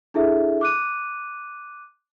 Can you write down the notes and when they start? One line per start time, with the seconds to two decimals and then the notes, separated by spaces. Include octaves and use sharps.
0.14 D4 E4 G#4 A4 E5
0.61 D6 F#6 D#7